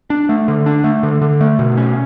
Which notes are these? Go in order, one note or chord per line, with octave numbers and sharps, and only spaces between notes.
D4
A3
D3
D4
A3
D3
D3
A3
B2
C#4